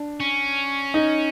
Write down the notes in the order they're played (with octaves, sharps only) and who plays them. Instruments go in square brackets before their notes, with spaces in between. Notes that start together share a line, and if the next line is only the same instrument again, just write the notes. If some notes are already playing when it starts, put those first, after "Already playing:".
Already playing: [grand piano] D4
[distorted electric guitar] C#4
[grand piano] D#4